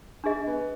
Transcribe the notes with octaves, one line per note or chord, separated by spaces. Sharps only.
D4 G#4 D#5
B3